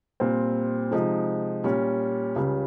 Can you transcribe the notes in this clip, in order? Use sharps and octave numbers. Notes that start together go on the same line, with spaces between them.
A#2 G3 C4
C3 F3 G#3 D#4
A#2 G3 C#4
C#2 C#3 G3